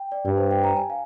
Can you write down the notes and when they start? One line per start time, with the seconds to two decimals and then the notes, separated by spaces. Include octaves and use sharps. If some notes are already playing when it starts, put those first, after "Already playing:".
Already playing: G5
0.12 D5
0.25 G2 D5
0.37 C5
0.51 G5
0.64 A#5
0.77 G#5
0.90 F5